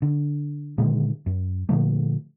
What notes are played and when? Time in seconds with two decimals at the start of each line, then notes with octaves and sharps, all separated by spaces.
0.02 D3
0.78 A#2 D3 D#3 G#3
1.26 F#2
1.69 A#2 D3 F3 A3